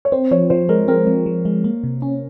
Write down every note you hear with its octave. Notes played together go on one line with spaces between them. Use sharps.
C#5
C4 C5
F3 C#5
F3 C5
G#3 A#4
C4 A#4
F3
F3
G#3
A#3
C3
C#4